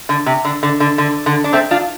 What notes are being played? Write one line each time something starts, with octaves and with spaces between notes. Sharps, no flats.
D3
C3
D3
D3
D3
D3
D3
D4
A3 C4
D4 F4